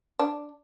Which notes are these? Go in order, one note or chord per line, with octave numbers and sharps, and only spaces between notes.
D4